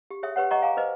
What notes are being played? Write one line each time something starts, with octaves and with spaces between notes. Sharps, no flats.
G4
G#4 C#5 E5 G5 D#6
G4 B4 C#5 F#5
D#5 F#5 A#5 C#6 D6
F5 G#5 A#5 D6
B4 C5 D#5